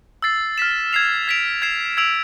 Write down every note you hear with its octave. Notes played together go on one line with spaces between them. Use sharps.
E6 A6 C7
F6 B6 E7
G#6 C7 F7
G#6 B6 D7 F7
G#6 C7 E7
E6 G#6 D7 F7